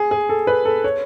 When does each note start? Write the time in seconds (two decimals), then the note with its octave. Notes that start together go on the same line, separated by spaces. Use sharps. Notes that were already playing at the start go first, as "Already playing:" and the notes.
Already playing: G#4
0.11 G#4
0.29 A4
0.47 B4
0.65 A4
0.84 C#5